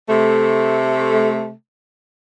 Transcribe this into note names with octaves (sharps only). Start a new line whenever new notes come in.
C3 A3